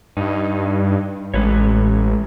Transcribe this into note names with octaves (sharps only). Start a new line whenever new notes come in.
G2 D#4
A1 G#3 B4 C#5